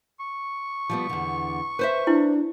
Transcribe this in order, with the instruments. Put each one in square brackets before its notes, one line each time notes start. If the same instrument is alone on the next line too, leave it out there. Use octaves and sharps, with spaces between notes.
[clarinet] C#6
[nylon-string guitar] F3 G3 B3
E2 D3
B4 C5 E5
[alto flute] D4 [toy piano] E4